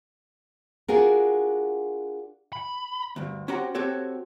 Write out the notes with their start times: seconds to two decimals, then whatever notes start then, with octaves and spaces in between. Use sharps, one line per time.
0.88 D4 F4 F#4 G#4 A#4
2.53 B5
3.16 D2 G2
3.48 C#4 F#4 G4 C5 F#5 A#5
3.75 C4 F#4 G4 A4 C#5